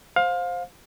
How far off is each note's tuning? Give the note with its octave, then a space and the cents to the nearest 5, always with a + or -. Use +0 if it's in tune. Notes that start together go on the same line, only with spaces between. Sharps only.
C5 +0 F5 +25